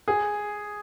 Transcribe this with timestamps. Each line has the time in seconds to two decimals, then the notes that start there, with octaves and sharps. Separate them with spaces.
0.08 G#4